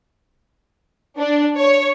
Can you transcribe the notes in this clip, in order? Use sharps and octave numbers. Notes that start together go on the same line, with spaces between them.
D4
C#5